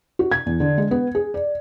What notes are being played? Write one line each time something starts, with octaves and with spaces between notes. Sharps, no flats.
F#4
G#6
E2
D3
G#3
B3
G#4
D5